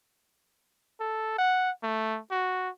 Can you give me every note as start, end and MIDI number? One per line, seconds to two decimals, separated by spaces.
1.00 1.34 69
1.38 1.71 78
1.83 2.19 57
2.31 2.69 66